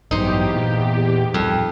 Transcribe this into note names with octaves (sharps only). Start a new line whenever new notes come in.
A1 E2 G2 F#3 D#4 G4 C5
A#2
D1 F2 G3